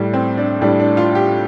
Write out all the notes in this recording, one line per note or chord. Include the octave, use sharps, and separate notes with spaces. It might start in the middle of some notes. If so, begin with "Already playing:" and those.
Already playing: A2 G3
C4
D4
A2 G3 D4
D4
F4
G4